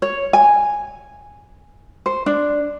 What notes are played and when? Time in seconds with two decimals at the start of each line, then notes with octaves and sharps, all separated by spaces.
0.02 C#5
0.33 G#5
2.06 C5
2.26 D4